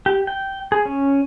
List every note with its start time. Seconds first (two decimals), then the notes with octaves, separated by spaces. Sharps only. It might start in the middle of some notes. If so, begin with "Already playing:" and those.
0.06 G4
0.27 G5
0.72 G#4
0.85 C#4